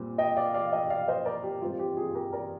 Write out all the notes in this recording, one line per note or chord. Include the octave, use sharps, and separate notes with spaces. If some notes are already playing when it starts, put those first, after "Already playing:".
Already playing: A#2 G3 C4
D#5 G5
D5 F5
D5 F5
D#5 G5
D5 F5
C5 D#5
A#4 D5
G4
G#2 G3 C4 F4
G4
F4 G#4
G4 A#4
A#4 D5